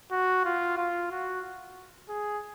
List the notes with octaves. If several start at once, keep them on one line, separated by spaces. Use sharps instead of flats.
F#4
F4
F4
F#4
G#4